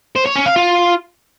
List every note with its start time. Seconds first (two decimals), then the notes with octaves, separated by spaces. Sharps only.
0.16 C5
0.26 C#5
0.36 C#4
0.46 F5
0.56 F4